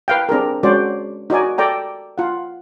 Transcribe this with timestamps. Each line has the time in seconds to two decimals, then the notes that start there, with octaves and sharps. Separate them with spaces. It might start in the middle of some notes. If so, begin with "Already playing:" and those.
0.08 B4 F5 G5
0.29 C4 D4 G#4 A#4
0.63 G#3 C#4 F#4 C5 D5
1.30 D#4 F#4 D5 G#5
1.58 A4 D5 G5 A#5
2.18 F4 F#5